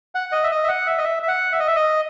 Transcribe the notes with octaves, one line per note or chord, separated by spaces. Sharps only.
F#5
D#5
E5
D#5
E5
F#5
E5
D#5
E5
E5
F#5
E5
D#5
E5
D#5